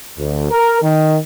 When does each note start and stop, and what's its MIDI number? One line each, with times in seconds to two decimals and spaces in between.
0.18 0.50 38
0.51 0.81 70
0.82 1.17 51